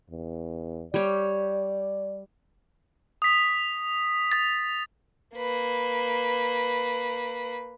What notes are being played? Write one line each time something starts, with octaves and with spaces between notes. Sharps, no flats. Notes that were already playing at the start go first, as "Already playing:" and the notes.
E2
G3 G4 C#5 D5
D#6 B6
D#6 A6
A#3 B4